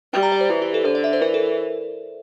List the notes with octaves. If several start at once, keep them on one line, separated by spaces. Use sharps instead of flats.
G3 G5
A#5
D5
C5
E3
G4
A4
D3 C5
D5
E5
C5
E3 A#4
A4